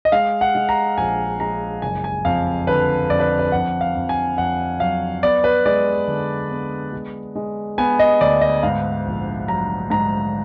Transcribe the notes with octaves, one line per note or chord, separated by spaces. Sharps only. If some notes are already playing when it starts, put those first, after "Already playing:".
D#5
G#3 F5
F#5
G#3
A#5
A#1 G#5
G#3 A#5
F#1 G#5
G#5
F2 F5
D3 B4
F2 D5
B4
B4
F2 F#5
F5
F2
G#5
F2 F#5
F#3 F5
B3 D5
B4
G#3 D5
D3
B3
G#3
G#3
B3 G#5
D#5
D2 D5
D#5
G#2 F5
A#1
F#3 A#5
G#2 A#5